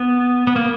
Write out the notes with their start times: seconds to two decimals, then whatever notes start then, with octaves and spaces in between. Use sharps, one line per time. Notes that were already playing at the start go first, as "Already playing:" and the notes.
Already playing: B3
0.47 B3
0.56 A#3